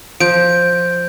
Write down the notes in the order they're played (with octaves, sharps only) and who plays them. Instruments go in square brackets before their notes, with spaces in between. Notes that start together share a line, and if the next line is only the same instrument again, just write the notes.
[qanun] F3 [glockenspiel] G6 D7